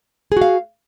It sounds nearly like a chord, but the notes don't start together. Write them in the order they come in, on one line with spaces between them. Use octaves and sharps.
G#4 F#4 F5